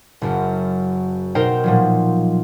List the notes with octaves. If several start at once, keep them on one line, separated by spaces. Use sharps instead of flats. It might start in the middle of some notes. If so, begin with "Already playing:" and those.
F#1 F#2
B2 D#4 A#4 C5 G5 E7
A#2 F3 F#3